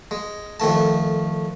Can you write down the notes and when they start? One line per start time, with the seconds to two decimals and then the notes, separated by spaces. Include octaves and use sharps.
0.11 G#3
0.60 F2 D#3 A3 A5